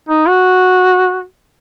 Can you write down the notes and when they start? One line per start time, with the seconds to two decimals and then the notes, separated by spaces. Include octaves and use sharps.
0.09 D#4
0.27 F#4